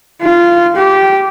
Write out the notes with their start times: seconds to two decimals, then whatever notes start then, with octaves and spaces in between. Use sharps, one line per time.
0.22 F4
0.76 G4